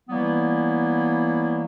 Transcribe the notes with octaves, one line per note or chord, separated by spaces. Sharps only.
E3 F#3 G3 A#3 B3 E4